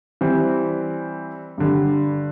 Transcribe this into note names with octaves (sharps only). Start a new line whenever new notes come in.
E3 G3 C4
G2 D3 G3